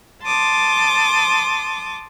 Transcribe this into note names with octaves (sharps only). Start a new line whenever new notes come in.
A5 C6 D6 D#6